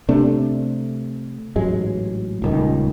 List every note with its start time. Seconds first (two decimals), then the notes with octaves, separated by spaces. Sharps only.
0.09 C3 A3 D4
1.56 A1 G#2 F#3 G#3
2.42 D#1 C#2 D#3